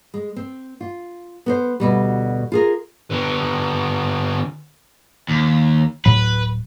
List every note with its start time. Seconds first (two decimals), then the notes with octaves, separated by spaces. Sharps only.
0.14 G#3
0.36 C4
0.81 F4
1.46 B3 A#4 C5
1.80 D2 B2 G3
2.52 F4 G#4 A#4
3.10 D3 B3
5.28 D#2
6.05 D1 A2 F#3 B4